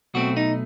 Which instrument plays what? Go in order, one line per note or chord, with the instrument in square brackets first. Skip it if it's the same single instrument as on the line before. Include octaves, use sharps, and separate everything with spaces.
[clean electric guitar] B1 B2 A3 C4 F#4
D#4